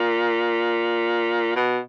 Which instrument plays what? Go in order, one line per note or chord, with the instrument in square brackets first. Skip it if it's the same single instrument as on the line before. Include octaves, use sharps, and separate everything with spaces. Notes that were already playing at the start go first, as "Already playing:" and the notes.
Already playing: [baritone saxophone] A#2
B2